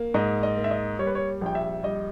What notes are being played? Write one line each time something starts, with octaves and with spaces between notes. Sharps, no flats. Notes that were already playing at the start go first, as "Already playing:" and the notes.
Already playing: A#3
G#2 D#5
D#5
A#3
E5
D#5
G3 C#5
B4
C#5
A#1 G5
E5
G3 D#5